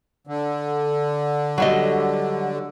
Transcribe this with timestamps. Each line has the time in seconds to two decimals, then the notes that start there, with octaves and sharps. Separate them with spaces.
0.27 D3
1.58 F#3 G3 D#5